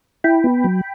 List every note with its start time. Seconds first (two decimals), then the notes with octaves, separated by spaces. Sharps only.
0.24 E4 G5 B5
0.44 B3
0.64 F#3